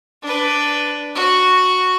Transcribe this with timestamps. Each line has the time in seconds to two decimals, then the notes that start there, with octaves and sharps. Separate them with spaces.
0.23 D4 B4
1.15 F#4